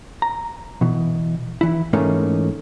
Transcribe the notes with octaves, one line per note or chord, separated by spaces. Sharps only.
A#5
B2 E3
E3 E4
G#2 E3 A3 A#3 C#4 D#4